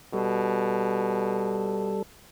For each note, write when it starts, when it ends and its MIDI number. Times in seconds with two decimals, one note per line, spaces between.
0.14 1.97 47
0.14 2.03 55
0.14 2.03 69